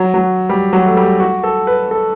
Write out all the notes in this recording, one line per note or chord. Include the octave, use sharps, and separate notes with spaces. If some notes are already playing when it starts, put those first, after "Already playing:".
Already playing: F#3
F#3
G3
F#3
A3
G3
F#4
A4
B4
A4